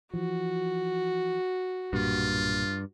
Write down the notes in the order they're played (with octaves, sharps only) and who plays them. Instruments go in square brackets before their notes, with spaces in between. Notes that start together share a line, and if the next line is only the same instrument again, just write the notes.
[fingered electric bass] E3 F3 [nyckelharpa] F#4
[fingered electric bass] B1 A#2 A#3 [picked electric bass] G2 [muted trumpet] F4